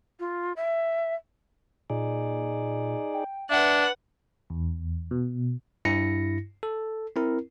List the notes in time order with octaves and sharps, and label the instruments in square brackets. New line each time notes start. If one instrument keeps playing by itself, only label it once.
[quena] F4
E5
[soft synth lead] A#2 [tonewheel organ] D#4 G#4 D5
[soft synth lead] G5
[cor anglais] D4 [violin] B4 F#5 [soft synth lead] E5
[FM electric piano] E2
B2
[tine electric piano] G2 E4 A#6 C#7
A4
C4 E4 A#4